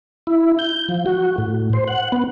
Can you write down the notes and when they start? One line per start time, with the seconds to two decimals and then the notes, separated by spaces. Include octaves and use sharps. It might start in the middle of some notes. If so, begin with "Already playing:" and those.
0.27 E4
0.59 G6
0.89 F3
1.06 F#4
1.38 A2
1.73 C5
1.88 F#5
2.12 B3